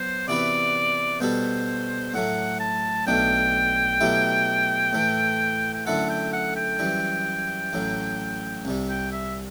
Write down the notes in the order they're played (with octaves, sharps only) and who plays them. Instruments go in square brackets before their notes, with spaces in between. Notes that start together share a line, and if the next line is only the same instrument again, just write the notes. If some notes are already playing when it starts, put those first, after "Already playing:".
Already playing: [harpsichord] F#3 B3 [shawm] C5
[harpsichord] C3 E3 B3 F#4 B4 [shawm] D5
[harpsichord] B2 G3 B3 F#4 A4 [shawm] C5
[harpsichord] A2 F#3 A3 [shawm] F#5
[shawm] A5
[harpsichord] B1 B2 A3 D4 [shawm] G5
[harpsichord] B2 F#3 A3 E4 G4
A2 E3 A3
[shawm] G5
[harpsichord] F#2 D3 A3 E4 A4 [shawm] F#5
[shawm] G5
F#5
G5
[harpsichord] F#2 E3 G3
A1 A2 F#3
C2 C3 G3
[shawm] G5
E5